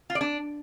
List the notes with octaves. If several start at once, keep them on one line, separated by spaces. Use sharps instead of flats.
F4
D5
D4